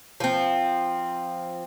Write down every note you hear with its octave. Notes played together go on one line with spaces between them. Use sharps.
F3 C4